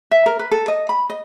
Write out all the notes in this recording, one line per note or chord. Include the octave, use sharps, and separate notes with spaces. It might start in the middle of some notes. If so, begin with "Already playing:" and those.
E5
A#4
B4
A4
D#5
B5
D#5